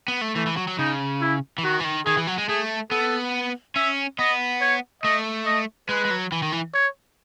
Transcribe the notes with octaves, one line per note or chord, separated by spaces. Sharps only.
B3
A3
E3 A3
E3
F#3
F#3
C#3 D#4
E4
E3
D#3 F#4
E3
D#3
D#3 G#4
E3
F#3
G#3
A3 G#4
B3 A4
C#4 E5
B3 D#5
C#5
A3 D#5
D#5
G#3 B4
G#3
F#3
E3
D#3
E3
C#5